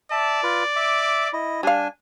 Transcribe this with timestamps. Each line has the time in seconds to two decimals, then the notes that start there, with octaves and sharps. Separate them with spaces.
0.11 D5 E5 A5
0.43 F4 B4
0.76 E5 D6
1.33 E4 D#5
1.63 G3 D4 F5 G#5